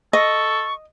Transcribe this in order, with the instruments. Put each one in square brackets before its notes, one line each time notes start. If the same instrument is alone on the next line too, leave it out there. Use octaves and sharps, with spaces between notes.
[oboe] A4 [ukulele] D#5 [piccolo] C#6